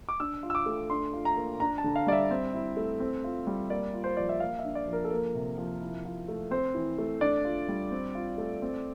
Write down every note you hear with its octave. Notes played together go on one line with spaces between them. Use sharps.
D6
D4 E6
F4
E6
D6
A3
D4 C6
F4
A#5
A#3
D4 A#5
A5
D3
F5
G3 D5
E5
C4
E4
A3
C4
F4
G3
A#3 D5
F4
C5
F3 D5
E5
A#3 F5
E5
D4
D5
F3
A#4
A4
A#3 A#4
C3
F3
E4
F3
A3
C4 C5
E3
A3
D4 D5
F4
G3
C4
F4
A3
C4